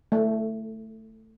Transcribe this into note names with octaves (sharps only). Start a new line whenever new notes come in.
A3